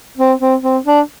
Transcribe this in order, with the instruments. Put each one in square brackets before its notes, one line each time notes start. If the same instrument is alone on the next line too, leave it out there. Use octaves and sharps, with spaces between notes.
[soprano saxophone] C4
C4
C4
D4